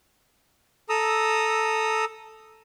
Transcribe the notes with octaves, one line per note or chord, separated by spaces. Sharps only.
A4 A#5 D#6 E6